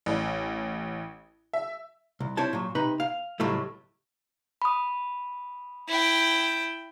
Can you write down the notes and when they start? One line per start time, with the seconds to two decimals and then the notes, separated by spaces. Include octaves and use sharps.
0.06 A1
1.53 E5
2.20 C2
2.37 C4 D4 E4 C5 C#5 A5
2.53 A#2 F#3
2.75 C3 D#4 B4 B5
3.00 F5
3.40 C#2 A2 F#3 G3 A3
4.62 B5 D#6
5.88 E4 G5